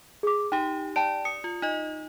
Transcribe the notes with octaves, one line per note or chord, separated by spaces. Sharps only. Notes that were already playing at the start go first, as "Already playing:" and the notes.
G#4 D6
D#4 G4 G5
D5 G5 A5 D7
D#6 C#7
F4
D#4 D#5